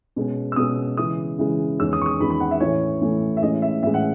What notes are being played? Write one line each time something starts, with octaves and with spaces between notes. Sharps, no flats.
B2 G#3 C#4
E6
B2 G#3 C#4 D#6
C#3 E3 G#3 D#6
C#3 E3 G#3
E2 D#3 G#3 C#4 E6
D#6
C#6
D#6
E2 D#3 G#3 C#4 B5
B5
F#5
E5
A2 E3 A3 C#4 C#5
A2 E3 A3 C#4
E5
A2 E3 G#3 C#4 D#5
E5
A2 E3 G#3 C#4 E5
F#5